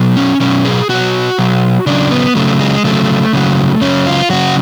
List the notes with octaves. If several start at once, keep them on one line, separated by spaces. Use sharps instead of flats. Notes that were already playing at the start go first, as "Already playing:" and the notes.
Already playing: B2 F#3
C#4
B2 F#3 C#4
G#4
B2 F#3 F#4
B2 F#3
C#3 F#3 D4
B3
C#3 F#3 A3
G#3
C#3 F#3 A3
C#3 F#3
C#3 F#3 C#4
F4
C#3 F#3 F#4